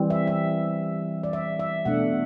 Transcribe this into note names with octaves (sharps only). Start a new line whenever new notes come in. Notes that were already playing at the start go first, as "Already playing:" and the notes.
Already playing: E3 G3 C4
E5
E5
D5
E5
E5
B2 A3 D4 F#5